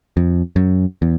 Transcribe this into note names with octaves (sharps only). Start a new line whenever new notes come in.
F2
F#2
E2